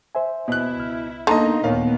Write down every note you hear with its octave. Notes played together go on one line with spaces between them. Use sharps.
C5 E5 G#5
B2 E4 F#6
C#2 F6
D3 A#3 B3 D#4 D#5 A#5 C6
D#2 A#2 B3 A#4 C#5 F5